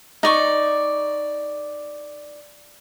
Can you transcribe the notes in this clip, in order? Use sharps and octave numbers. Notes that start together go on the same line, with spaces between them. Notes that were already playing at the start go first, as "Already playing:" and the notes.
D#4 D5 C#6